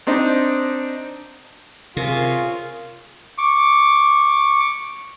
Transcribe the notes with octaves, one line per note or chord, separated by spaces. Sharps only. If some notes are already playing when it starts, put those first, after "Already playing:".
C4 D4 D#4
C3 C#4 F4 G#4 A#4
C#6 D6